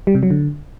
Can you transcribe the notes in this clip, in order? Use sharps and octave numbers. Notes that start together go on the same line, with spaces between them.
G3
C3
F#3
D3